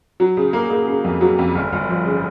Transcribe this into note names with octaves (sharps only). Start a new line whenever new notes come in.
F#3
C#3
A#3
A#3
C#3
F2
F#3
F2
G1
G1
F3
C#3